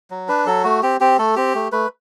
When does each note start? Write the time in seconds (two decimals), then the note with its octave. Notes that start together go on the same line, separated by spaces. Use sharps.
0.10 F#3
0.29 D4 B4
0.46 F#3 A4
0.64 A3 F#4
0.83 C4 G4
1.01 C4 G4
1.19 A3 A4
1.36 C4 G4
1.55 A3
1.72 A3 B4